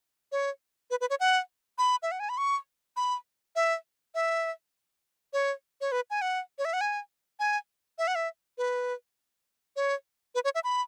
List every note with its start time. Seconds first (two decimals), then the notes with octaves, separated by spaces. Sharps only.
0.32 C#5
0.91 B4
1.01 B4
1.10 C#5
1.20 F#5
1.78 B5
2.03 E5
2.12 F#5
2.20 G#5
2.29 B5
2.38 C#6
2.97 B5
3.56 E5
4.15 E5
5.33 C#5
5.81 C#5
5.92 B4
6.10 G#5
6.22 F#5
6.59 C#5
6.65 E5
6.73 F#5
6.81 G#5
7.40 G#5
7.98 E5
8.07 F#5
8.15 E5
8.58 B4
9.76 C#5
10.35 B4
10.44 C#5
10.55 E5
10.64 B5